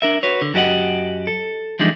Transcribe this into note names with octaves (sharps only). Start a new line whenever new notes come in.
D4 A#4 E5
F#4 B4 C#5
D3
F#2 F#4 G4 D#5 F#5
A4
E3 F3 G3 G#3 D4 D#4